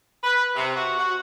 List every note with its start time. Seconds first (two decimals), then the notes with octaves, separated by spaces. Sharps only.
0.24 B4
0.56 C3
0.75 F#4
0.98 F#4